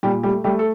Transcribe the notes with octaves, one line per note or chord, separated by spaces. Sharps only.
A#2 G3 G4
G3 A3 G4
G3 A3 G4
A4